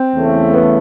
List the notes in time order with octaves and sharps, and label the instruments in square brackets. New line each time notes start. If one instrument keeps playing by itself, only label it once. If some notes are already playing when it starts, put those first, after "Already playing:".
Already playing: [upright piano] C4
[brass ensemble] E2 C#3 E3 A3
[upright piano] B3